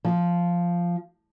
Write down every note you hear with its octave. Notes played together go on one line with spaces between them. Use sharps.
F3